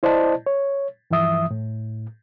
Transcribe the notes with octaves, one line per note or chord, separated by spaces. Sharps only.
E4 C5 D5 D#5 A5
C#5
G2 E3 F3 E5 D#6
A2